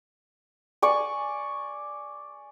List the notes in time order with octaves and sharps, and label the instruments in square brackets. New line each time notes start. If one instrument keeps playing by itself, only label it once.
[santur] D5 G#5 C#6